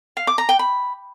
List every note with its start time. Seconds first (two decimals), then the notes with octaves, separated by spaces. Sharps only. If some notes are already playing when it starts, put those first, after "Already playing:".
0.17 F5
0.27 D6
0.38 A#5
0.49 G5
0.59 B5